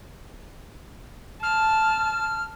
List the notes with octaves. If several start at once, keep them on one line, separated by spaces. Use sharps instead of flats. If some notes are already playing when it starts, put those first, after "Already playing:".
A5 F6